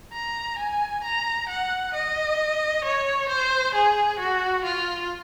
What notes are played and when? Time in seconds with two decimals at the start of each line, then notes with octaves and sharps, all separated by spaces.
0.12 A#5
0.58 G#5
1.03 A#5
1.49 F#5
1.94 D#5
2.84 C#5
3.28 C5
3.74 G#4
4.19 F#4
4.64 F4